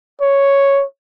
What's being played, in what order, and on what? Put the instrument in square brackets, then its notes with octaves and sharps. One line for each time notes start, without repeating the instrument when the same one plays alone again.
[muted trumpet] C#5